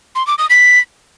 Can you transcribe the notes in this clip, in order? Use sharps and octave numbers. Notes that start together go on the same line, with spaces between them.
C6
D6
D#6
B6